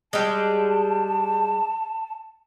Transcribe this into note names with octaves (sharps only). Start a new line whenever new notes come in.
G3 G#3 A5